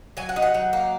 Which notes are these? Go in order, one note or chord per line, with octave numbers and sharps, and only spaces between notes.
F#3 G#5
F#5
D#4
F#5
F#3
A#3